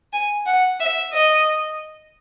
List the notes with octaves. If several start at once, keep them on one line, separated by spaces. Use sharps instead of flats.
G#5
F#5
E5
D#5